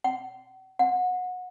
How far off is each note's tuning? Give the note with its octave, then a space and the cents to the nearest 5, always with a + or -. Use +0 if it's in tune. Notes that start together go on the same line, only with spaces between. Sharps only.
F#5 +40
F#5 -25